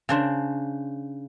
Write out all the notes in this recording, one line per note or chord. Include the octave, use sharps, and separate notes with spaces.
C#3 D4 C5